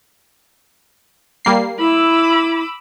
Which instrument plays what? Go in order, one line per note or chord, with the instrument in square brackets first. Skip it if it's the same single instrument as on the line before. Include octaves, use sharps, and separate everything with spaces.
[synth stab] G3 A#3 C7
[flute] E4 [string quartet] B5 D6 E6